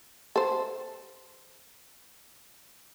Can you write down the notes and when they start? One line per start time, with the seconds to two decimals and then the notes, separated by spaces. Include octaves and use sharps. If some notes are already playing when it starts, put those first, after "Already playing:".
0.36 A4 C5